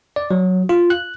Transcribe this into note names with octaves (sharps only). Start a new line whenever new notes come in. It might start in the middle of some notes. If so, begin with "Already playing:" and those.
D5
F#3
F4
F#6